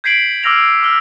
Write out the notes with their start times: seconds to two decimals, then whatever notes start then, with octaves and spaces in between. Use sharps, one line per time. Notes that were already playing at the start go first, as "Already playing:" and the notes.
0.04 G6 G#6 B6 C7 D7 F#7
0.43 D6 E6 F6 A#6 F7 F#7
0.83 D6 E6 F6